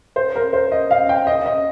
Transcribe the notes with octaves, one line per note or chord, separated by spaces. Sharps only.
C5
A#4
C5
D#5
F5
G5
D#5
D#5